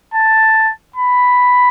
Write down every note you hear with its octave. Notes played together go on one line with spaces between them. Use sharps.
A5
B5